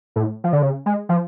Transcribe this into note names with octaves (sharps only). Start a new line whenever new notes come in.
A2
F3
D3
C#3
G#3
F3